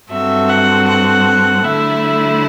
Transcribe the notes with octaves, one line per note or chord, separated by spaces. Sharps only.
G2 F#3 C4 F#4 A4 E5
F#5
F#5
D3 F#3 A3 E4 E5